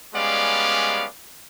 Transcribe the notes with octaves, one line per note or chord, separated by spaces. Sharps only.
G3 G#3 B3 C#4 D5 F5